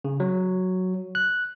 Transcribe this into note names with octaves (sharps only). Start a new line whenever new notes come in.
C#3
F#3
F#6